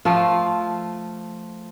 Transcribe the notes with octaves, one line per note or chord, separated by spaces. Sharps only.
F3 A3 F4